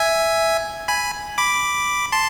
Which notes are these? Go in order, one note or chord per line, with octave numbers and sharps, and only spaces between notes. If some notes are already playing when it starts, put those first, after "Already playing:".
Already playing: E5 G#5
G#5 B5
B5 D6
A5 C6